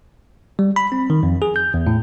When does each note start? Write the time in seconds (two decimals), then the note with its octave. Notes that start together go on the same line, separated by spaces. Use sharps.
0.59 G3
0.76 B5
0.92 C4
1.10 D#3
1.23 F2
1.42 G#4
1.56 G6
1.74 E2
1.87 A2